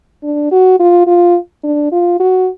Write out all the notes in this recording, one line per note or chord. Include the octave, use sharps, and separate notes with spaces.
D4
F#4
F4
F4
D4
F4
F#4